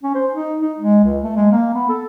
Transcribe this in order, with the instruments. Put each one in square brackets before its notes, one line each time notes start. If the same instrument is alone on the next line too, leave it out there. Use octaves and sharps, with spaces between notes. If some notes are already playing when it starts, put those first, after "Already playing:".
[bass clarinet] C#4
C5
D#4
D#4
G#3
C#2
A3
G#3
A#3
B3
A4